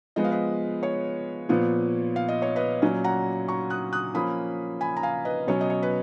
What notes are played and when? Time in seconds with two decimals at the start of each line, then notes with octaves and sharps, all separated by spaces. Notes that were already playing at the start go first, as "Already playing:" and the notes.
0.16 F3 G#3 B3 D#5
0.24 F5
0.32 B4 D#5
0.83 C#5
1.49 A#2 F3 B3
2.16 F5
2.28 D#5
2.42 C#5
2.56 B4 D#5
2.82 A#2 F#3 C#4
3.04 F#5 A#5
3.48 A#5 C#6
3.70 D#6 F#6
3.93 D#6 F#6
4.14 F3 A#3 C#4 B5 D#6
4.81 G#5 B5
4.97 A#5
5.03 F5 G#5
5.25 B4 D#5
5.47 B2 F#3 C#4 C#5
5.61 D#5
5.70 C#5
5.83 B4